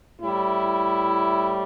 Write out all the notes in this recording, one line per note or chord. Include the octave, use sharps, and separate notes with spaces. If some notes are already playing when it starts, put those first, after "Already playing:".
A2 G3 E4